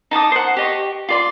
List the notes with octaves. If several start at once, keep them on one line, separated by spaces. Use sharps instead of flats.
D#4 A5 D6 D#6
C5 F#5
G4 D#5 C#6
F4 D5 C6